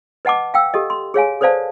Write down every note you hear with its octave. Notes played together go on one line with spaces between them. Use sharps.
B4 D#5 F#5 A5 D6
F5 G5 E6
G4 A4 D#5
C6
G#4 C#5 F5 G#5
A4 B4 C5 D5 F5 A5